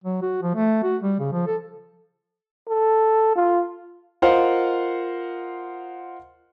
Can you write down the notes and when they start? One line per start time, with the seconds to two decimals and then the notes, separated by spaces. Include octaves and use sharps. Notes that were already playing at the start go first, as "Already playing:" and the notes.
0.04 F#3
0.22 F#4
0.43 F3
0.55 A3
0.83 F#4
1.03 G3
1.20 C#3
1.32 F3
1.47 A4
2.69 A4
3.35 F4
4.22 F4 A#4 C5 D#5 F5 F#5